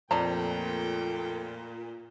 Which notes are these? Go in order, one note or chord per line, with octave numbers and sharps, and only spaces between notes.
F2 A#2 A3 D5 G5 A5 A#5